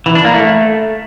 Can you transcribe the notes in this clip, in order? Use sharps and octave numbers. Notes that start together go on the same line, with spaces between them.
E3
D4
A#3
A3